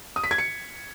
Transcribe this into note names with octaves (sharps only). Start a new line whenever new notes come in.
D#6
B6
G#6
C#7